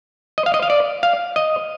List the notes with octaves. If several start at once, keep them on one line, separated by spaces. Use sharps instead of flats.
D#5
F5
D#5
F5
D5
F5
D#5